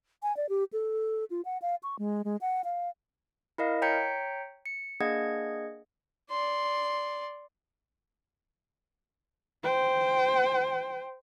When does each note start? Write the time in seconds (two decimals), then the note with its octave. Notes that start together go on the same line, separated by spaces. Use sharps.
0.23 G#5
0.37 D5
0.49 G4
0.73 A4
1.30 F4
1.45 F#5
1.62 F5
1.83 C#6
1.99 G#3
2.25 G#3
2.41 F#5
2.64 F5
3.58 E4 A#4 D#5 F5
3.82 C#5 G5 A#5 G6 B6 C#7
4.66 C#7
5.00 A#3 D4 G#4 D#5 F#5 G#6
6.31 D5 C6
9.63 C5 G5